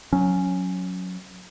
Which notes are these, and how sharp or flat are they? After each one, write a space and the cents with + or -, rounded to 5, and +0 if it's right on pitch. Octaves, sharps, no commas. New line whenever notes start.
F#3 -15 C#4 +0